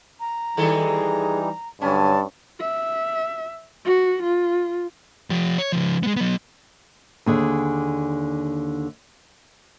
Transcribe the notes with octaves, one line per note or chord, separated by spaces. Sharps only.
A#5
D#3 E3 G3 G#3 D#4 A4
G2 D3 F#3 C#4 G#5 A5
E5
F#4
F4
F3 G4
C#5
C#3 F3
G#3 B3
F#3 B3
D#2 D3 G#4